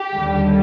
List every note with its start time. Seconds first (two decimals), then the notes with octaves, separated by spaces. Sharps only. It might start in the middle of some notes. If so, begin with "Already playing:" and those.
Already playing: G4
0.14 D#2 D3 G3